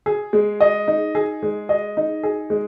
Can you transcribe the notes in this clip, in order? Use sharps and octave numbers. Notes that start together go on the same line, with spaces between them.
G#4
G#3
D#5
D#4
G#4
G#3
D#5
D#4
G#4
G#3